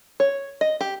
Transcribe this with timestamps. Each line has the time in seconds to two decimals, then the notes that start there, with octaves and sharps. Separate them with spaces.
0.20 C#5
0.61 D#5
0.81 G4